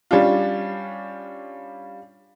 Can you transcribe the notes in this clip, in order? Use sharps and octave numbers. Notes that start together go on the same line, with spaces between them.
G3 C#4 D4 F4